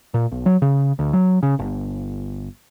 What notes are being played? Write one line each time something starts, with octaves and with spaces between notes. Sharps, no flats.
A#2
B1
F#3
C#3
D2
F#3
C#3
G1